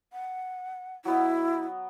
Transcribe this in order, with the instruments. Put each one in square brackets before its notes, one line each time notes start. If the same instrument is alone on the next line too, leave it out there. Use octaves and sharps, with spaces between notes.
[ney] F#5
[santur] F#3 B3 D#5 [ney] E4